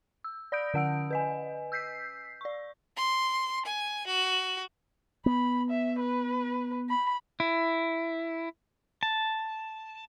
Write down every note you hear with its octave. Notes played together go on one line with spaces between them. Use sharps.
E6
D5 B5 D#6 G6 D7
D3 C#4 F#5 E6 D7
B4 D#5 G#5
E6 G6 B6 C7
D5 C#6
C6
G#5
F#4
B3 B5
E5
B4
B5
E4
A5